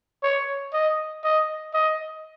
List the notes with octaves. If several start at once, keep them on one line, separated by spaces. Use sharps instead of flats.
C#5
D#5
D#5
D#5